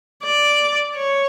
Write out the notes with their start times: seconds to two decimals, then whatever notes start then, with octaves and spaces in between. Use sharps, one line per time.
0.24 D5
0.97 C#5